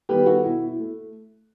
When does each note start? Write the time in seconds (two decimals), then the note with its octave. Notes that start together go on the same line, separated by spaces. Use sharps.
0.09 D#3 G3 B3 G4 B4
0.26 F#4 A4
0.44 B2 E4
0.68 E4
0.79 A3